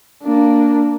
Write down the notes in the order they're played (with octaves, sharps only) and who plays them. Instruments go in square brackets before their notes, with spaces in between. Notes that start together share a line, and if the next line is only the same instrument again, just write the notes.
[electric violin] A#3 D4